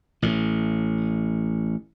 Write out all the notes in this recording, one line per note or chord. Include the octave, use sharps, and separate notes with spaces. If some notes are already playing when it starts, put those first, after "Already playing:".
A1 A2